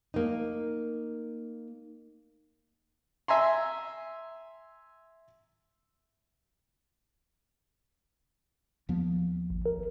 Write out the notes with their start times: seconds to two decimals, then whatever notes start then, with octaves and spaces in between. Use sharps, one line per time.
0.14 A#3 D#4
3.28 E5 G#5 A#5 C6
8.89 D#2 F3 B3
9.50 G#1
9.66 A#4